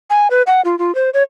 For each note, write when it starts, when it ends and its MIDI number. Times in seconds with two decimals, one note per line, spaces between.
0.10 0.28 80
0.30 0.42 71
0.47 0.61 78
0.65 0.78 65
0.79 0.94 65
0.95 1.10 72
1.14 1.23 73